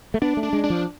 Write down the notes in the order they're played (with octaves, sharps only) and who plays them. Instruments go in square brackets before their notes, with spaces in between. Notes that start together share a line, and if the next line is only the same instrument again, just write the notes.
[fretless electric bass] A3
[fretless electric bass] B3 [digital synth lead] D4
[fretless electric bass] A3
[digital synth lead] D4
[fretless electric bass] G#3
[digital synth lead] D4
[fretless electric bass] F3